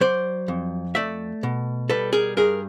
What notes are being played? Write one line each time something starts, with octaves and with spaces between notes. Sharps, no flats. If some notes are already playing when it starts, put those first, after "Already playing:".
F#3 C5 D5
F2
A3 D5 E5
B2
G3 A4 B4
G#4 A#4
G2 G#4 A#4